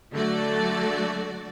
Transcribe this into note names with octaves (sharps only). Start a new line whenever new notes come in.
D3 F#3 A3 F#4 A4 D5